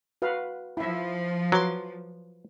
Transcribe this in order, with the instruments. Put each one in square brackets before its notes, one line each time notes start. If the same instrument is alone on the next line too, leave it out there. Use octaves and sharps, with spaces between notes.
[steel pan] F#4 B4 F5
[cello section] F3 [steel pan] E4 E5
[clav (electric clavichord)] F#3 [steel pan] B4 C6 D6